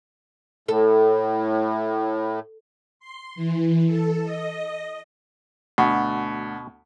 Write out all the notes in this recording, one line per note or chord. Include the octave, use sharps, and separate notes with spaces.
A2 A4
C6
E3
A4
D#5
D2 B2